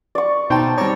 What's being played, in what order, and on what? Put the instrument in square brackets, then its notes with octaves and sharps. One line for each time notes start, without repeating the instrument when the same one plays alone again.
[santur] D5 C#6
[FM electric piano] B2 A5 [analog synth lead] D#4 [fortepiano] C5 G5 C6
[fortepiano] G3 C4 [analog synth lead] C#5 [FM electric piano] A5 A#5 D6